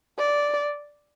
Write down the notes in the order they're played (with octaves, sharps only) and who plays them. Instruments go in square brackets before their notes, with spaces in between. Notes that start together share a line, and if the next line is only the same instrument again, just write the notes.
[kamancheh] D5